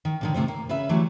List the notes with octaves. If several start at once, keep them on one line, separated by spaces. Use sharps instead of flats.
D#3
A#2 D3 D#3
A2 C3 A3 C5
A#3
C#3 B4 E5
D3 E3 F#3 G3 A3